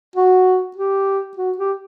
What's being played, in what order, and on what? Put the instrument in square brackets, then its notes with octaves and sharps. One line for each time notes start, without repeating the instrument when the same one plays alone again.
[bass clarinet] F#4
G4
F#4
G4